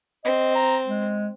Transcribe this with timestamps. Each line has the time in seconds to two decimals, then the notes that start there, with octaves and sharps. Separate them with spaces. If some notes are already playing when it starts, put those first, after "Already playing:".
0.25 C4 D#5
0.55 A#5
0.87 G#3